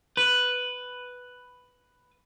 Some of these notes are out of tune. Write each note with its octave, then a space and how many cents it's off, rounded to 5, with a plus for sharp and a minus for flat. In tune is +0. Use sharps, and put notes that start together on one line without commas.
B4 +5